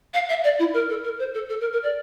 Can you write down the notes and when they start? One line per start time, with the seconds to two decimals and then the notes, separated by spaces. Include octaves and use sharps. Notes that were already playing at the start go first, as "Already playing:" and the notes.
0.14 F5
0.29 E5
0.44 D5
0.59 E4
0.74 A#4
0.90 A4
1.04 A#4
1.19 C5
1.34 A4
1.49 A4
1.61 A#4
1.73 A#4
1.83 D5